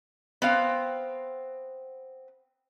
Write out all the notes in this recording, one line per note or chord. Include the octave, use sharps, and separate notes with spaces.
B3 C4 F5